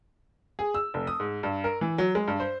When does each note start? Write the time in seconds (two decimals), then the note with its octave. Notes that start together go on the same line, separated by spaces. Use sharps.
0.59 G#4
0.74 E6
0.94 F1
1.07 D#6
1.20 G#2
1.43 G2
1.64 A#4
1.81 E3
1.98 F#3
2.15 G#3
2.28 G2
2.40 C5